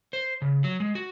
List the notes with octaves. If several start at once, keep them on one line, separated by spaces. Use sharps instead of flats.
C5
C#3
F#3
G#3
F#4